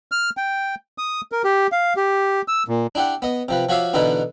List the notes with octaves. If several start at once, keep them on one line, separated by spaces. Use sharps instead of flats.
F6
G5
D#6
A#4
G4
F5
G4
E6
A#2
D4 E4 G4 D5 F#5
B3 D#5
C3 F3 B4
F3 F#4 C#5 E5 F5 D6
B2 D3 E3 D#4 E4 B4